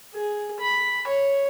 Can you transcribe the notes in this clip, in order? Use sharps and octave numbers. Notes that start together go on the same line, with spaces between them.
G#4
B5
C#5